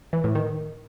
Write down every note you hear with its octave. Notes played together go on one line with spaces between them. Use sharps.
E3
A2
D#3